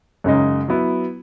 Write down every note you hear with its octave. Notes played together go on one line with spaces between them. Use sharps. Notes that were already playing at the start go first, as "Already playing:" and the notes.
F#2 C#3 G#3 D#4
F#3 B3 E4